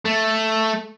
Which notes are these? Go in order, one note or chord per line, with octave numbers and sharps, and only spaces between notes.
A3